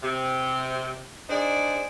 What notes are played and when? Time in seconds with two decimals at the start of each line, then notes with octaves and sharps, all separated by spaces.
0.03 C3
1.29 D4 D#4 G#4 C5 D5